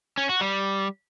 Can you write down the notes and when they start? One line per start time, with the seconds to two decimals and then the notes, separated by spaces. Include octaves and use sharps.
0.18 C#4
0.29 F#4
0.41 G3